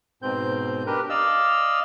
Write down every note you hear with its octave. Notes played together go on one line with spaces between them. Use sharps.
G#2 B2 C4 G6
D4 G4 A#4 B4
D5 D#5 F5 E6